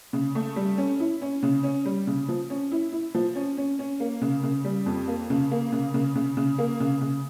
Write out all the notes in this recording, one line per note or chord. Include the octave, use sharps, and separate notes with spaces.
C#3
A3
G3
C#4
E4
C#4
C#3
C#4
G3
C#3
F3
C#4
E4
E4
F3
C#4
C#4
C#4
A#3
C#3
C#3
G3
F2
A#3
C#3
A#3
C#3
C#3
C#3
C#3
A#3
C#3
C#3